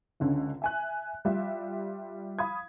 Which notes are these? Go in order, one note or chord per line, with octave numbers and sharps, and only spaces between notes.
C#2 D3 C#4
E5 G#5 F#6
G3 F4 E5
F5 B5 D#6 G#6